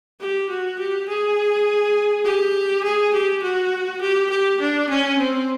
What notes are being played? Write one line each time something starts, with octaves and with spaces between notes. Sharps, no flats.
G4
F#4
G4
G#4
G4
G#4
G4
F#4
G4
G4
D4
C#4
C4